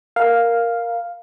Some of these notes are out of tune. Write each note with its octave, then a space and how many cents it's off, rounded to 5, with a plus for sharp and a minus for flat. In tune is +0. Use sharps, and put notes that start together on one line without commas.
A#4 +0 F5 +0